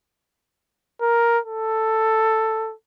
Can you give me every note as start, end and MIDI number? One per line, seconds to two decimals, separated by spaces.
1.01 1.38 70
1.45 2.73 69